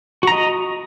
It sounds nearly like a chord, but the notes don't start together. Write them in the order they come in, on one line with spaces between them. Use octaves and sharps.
F#4 A#5 D#5